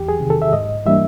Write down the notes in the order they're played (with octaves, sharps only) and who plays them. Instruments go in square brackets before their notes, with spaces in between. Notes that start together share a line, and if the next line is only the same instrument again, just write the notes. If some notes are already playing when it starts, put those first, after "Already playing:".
Already playing: [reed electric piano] E2 G4
G#4
C3 D#3
A4
E5
G#2 D#5
E3 G3 A#3 D4 E5